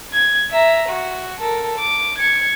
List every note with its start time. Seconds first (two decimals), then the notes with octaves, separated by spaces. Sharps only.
0.13 G#6
0.51 E5 A#5
0.89 F#4
1.40 A4 A#4
1.78 D6
2.18 G#6 C#7